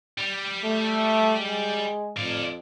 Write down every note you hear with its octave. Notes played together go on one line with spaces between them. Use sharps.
G3
A3
G#3
F2 D5 F5